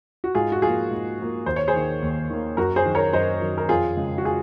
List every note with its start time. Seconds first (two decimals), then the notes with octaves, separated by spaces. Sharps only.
0.24 F#4
0.35 G#2 F4 G#4
0.52 F#4
0.62 F3 A#3 F4 G#4
0.91 G#2
1.19 F3 A#3
1.46 D#2 C5
1.56 C#5
1.68 G#4 C5
1.74 D#3 A#3
2.02 D#2
2.30 D#3 A#3
2.57 F#2 F#4 A#4
2.76 G#4 C5
2.85 D#3 F#3
2.95 A#4 C#5
3.13 F#2 C5 D#5
3.41 D#3 F#3
3.58 A#4
3.69 F2 F4 G#4
3.97 C#3 G#3
4.18 F#4
4.25 F4 G#4